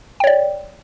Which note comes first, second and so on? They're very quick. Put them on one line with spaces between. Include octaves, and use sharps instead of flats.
G5 C#5 D5